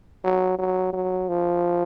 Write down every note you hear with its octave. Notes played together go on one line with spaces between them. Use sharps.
F#3
F#3
F#3
F3